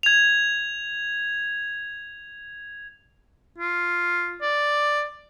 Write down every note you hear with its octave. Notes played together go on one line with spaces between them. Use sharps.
G#6 F7
F4
D5